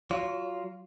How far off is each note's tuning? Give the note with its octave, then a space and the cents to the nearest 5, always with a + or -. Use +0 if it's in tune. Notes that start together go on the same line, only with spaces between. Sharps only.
F#3 +10 F4 +0 C#5 +40